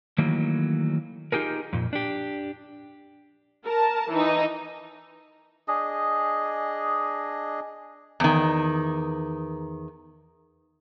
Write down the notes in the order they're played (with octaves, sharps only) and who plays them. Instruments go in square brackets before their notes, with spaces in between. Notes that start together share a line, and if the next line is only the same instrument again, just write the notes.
[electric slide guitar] D#3 E3 F#3 A3 A#3
D#4 F4 G4 G#4 A#4
F2 A#2
D4 G4
[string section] A#4 A5
E3 D#4
[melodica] D4 G#4 D#5
[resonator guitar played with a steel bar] E2 D#3